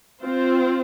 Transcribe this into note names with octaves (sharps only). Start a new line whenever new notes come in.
C4 F4 C5